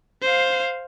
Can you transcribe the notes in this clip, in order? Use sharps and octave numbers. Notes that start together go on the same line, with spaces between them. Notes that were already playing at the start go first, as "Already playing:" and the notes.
C5 F5